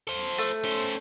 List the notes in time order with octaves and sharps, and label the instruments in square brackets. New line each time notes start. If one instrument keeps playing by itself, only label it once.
[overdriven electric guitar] A4 C5
[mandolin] A3
[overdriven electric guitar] C#4 C5